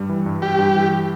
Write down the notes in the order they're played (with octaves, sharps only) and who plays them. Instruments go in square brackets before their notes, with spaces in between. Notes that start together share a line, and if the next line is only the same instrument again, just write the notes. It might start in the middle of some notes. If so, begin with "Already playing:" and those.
Already playing: [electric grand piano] G2 G3
E3
G2
[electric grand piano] G3 [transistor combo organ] G4
[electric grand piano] G2
E3